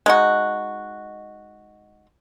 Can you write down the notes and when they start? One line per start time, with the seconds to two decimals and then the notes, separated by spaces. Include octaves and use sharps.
0.06 G#3 D#4 F#4